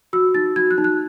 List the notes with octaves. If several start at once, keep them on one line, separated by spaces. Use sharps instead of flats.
F#4 E6
D#4 A6
F#4 G#6
F#6
D#4
F#6